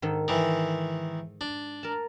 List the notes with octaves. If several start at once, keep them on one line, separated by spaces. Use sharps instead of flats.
G#2 D#3 A4
D#3 E3 D5
D4
A#4 A5